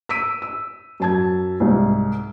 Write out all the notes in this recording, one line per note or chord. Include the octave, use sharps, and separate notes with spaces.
E6 B6 D7 D#7
E6
F#2 A5 G#6
C2 G#2